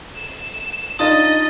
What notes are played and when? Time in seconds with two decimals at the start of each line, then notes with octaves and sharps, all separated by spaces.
0.16 E7
0.99 D4 D#4 F4 D#5 D#6 A6